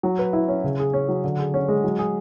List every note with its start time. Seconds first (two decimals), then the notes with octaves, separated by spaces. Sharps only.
0.03 F#3
0.19 B4
0.33 E4
0.48 C#4
0.64 C#3
0.79 G#4
0.94 C#4
1.09 F#3
1.24 D3
1.39 G#4
1.54 C#4
1.68 G#3
1.84 F#3
1.99 G#4